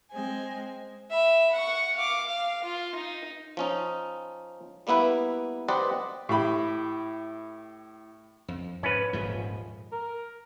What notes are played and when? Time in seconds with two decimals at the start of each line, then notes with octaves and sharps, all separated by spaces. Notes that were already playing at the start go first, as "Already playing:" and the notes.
0.11 G#3 C4 G#5
1.10 E5 B5
1.53 F#5 C#6
1.96 F5 D6
2.27 F5
2.64 F4
2.95 D#4
3.57 F3 C#4 D#4
4.87 G3 A#3 B3 E4 B4
5.68 G4 B4 C5 D5 D#5 F#5
6.29 A2 G4 B5
8.48 F2
8.83 G#2 C#4 B4
9.13 D#1 G#2 F3
9.92 A#4